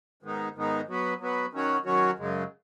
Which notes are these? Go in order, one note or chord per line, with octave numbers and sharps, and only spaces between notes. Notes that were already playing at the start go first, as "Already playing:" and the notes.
G#2 D#3 G#3 B3 D#4
G#2 D#3 G#3 B3 D#4
F#3 B3 F#4 B4
F#3 B3 F#4 B4
D#3 F#3 C#4 F#4 C#5
D#3 F#3 C#4 F#4 C#5
F#2 C#3 G#3